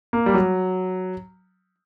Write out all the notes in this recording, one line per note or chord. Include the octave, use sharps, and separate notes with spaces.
A#3
G3
F#3